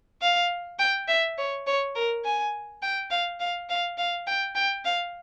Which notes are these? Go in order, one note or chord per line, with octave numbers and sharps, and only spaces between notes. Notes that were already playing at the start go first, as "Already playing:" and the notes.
F5
G5
E5
C#5
C#5
A#4
G#5
G5
F5
F5
F5
F5
G5
G5
F5